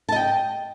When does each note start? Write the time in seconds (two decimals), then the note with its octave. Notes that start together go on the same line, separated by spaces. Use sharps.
0.09 A5
0.12 D#5
0.16 G5